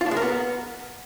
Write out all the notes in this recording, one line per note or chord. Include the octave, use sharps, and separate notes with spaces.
F4
D4
G#3
A#4
B3